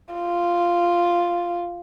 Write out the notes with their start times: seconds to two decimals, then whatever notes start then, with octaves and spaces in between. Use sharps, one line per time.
0.14 F4